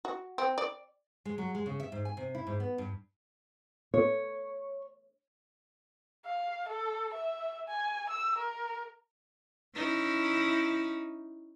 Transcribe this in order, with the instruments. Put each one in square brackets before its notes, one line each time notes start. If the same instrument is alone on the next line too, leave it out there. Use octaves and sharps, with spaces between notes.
[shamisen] F#4
C4
D5
[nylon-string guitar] G#3
F#3
G#3
C#3
E5
G#2
G#5
C3
E4
G#2
B3
G2
C#5
[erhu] F5
A4
E5
G#5
E6
A#4
[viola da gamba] C#4 D#4 E4